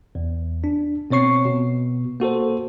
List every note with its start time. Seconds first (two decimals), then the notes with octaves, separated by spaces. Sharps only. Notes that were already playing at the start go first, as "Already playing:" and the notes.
0.15 E2
0.64 D4
1.10 B2 C4 C#5 C#6 C7
1.45 B2
2.20 A#3 F#4 A4 C5